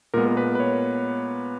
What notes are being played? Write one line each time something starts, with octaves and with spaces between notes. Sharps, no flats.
A#2 G#3 B3 A#4
A#4
B4
B4
C#5